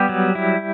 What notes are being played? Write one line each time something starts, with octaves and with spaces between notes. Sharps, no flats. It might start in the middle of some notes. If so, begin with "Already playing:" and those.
Already playing: G3 B3 G4
F#3
E4